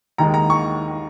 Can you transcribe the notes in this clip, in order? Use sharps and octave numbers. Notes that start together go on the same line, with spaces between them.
D#2 D#3 G#3 A#5
A#5
C#6